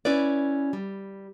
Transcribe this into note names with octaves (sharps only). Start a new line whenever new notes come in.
C#4 E4 B4 D5
G3